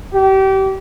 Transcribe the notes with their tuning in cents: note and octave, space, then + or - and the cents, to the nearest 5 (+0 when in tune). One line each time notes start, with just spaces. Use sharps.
G4 -30